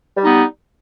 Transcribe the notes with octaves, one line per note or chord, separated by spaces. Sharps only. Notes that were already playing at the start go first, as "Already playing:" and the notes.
G3 B3 D#4